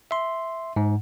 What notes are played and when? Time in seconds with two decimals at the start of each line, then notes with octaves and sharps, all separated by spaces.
0.11 E5 C6
0.76 G#2